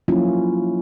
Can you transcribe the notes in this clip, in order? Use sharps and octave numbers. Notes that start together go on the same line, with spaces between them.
F3 F#3 A#3 C#4 E4 F4